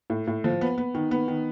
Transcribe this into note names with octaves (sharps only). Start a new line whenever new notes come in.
A2
A2
F3
B3
B3
D#3
B3
D#3